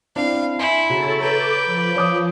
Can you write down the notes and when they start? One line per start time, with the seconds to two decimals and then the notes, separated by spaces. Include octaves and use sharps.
0.16 C4 D4 E4 F5
0.59 E4 G#5 C6
0.89 C#3 F#4 A4 C#5 A5 A#5
1.20 B4 G5 A#5 D6
1.65 F3
1.96 C#5 D6 D#6